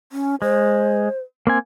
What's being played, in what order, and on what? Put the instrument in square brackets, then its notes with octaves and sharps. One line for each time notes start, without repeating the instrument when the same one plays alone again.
[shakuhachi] C#4
[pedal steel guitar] G#3 [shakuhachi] C5
[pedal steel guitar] A#3 C4 G#5